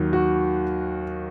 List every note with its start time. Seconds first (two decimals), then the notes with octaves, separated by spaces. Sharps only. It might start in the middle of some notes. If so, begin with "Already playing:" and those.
Already playing: D#2 D#3 F#3
0.13 F#4